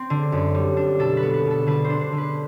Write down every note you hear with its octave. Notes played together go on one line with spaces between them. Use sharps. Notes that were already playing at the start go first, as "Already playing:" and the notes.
Already playing: C4
D3
F#2
G3
D4
B2 A4
B4
B3
B4
B2
A4
D3 B4
C5
D4
C5
D3
B4